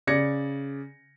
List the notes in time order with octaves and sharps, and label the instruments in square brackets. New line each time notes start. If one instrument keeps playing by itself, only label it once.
[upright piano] C#3 D5 G#6 A#6 C#7